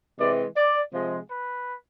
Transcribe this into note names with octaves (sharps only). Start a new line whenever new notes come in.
C3 E3 G#3 D5
D5
C3 F3 G#3
B4